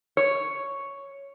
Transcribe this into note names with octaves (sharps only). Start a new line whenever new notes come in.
C#5